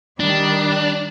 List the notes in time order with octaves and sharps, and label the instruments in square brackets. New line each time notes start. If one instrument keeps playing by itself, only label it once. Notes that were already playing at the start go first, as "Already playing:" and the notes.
[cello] D#3 G3 [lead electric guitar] D4